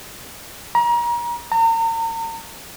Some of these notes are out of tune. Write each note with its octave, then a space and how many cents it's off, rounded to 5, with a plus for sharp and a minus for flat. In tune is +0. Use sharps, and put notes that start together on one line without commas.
A#5 +30
A#5 -40